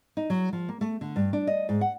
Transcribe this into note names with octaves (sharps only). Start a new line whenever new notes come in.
D#4
F#3
F3
A#3
A3
D3
G2
D4
D#5
G#2
F#5